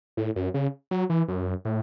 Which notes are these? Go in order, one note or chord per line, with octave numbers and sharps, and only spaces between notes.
A2
F#2
C#3
F#3
E3
F#2
A2